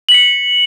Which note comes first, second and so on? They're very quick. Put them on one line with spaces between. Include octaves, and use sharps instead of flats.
F#7 B6 C#7